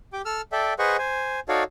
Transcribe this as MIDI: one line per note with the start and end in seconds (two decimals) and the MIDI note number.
0.13 0.22 67
0.13 0.22 79
0.13 0.22 86
0.25 0.42 69
0.25 0.42 88
0.25 0.42 89
0.52 0.74 69
0.52 0.74 74
0.52 0.74 76
0.52 0.74 79
0.79 0.97 68
0.79 0.97 71
0.79 0.97 72
0.79 0.97 75
0.79 0.97 78
0.79 0.97 85
0.98 1.40 72
0.98 1.40 80
1.49 1.63 63
1.49 1.63 66
1.49 1.63 69
1.49 1.63 73
1.49 1.63 74
1.49 1.63 77